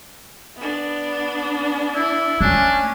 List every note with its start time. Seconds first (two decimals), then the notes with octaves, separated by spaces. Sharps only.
0.57 B3 D4
1.95 E4
2.41 A3 C#4 D4